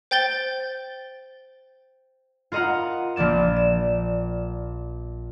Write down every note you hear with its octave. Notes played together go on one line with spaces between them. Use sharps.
C5 G5 G6 A6 G7
F4 A#4 D#5 F#5 A#5
A#1 F3 A#3 D5 E7
E7